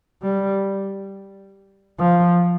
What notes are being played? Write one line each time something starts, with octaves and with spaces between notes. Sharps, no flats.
G3
F3